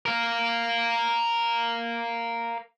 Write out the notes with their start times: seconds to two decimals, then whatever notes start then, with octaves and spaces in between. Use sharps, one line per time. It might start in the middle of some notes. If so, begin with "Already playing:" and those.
0.06 A#4 F5